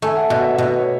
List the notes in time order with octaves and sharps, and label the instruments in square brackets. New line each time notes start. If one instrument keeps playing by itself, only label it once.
[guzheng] A3 [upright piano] G#5
[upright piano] F#5
[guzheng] B2 [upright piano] E5
[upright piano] E5
E5
[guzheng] B2 [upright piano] D#5
[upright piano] C#5